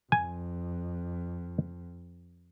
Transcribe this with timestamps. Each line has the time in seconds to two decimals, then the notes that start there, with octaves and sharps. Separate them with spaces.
0.12 F2 G#5